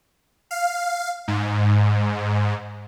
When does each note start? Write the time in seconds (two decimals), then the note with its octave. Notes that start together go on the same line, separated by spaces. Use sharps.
0.51 F5
1.28 G#2